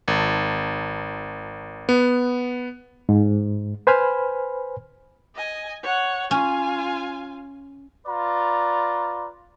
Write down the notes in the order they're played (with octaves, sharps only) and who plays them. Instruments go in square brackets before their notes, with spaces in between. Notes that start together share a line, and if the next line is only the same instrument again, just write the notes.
[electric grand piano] G#1
B3
[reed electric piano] G#2
B4 C5 G#5 B5 F6
[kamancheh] D#5 G#5
C#5 F#5
[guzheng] C#4 [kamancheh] F4 G#5
[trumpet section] F4 B4 D5 A#5